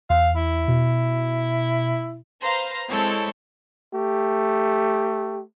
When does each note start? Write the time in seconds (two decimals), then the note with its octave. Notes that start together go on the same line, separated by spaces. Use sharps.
0.10 E2 F5
0.36 E4
0.68 B2
2.43 B4 C5 F5 A#5 C6
2.89 G#3 C4 E4 A4 C#5
3.94 A3 G4